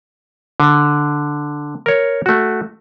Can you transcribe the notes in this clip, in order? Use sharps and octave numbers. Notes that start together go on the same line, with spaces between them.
D3
A#4 C#5
A3 F#4